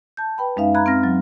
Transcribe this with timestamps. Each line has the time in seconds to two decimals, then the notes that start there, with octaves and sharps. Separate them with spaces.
0.17 A5 G6
0.38 B4 G5 B5
0.57 F#2 G#3 C#4 D#4 E5 F5
0.75 A#5 B5 F#6 G#6
0.86 C4 F6 A#6
1.04 F#3